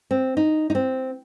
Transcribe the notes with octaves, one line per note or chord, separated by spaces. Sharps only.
C4
D#4
D#4
C4